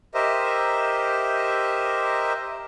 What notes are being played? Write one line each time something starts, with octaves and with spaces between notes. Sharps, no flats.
G4 A#4 C5 D#5 E5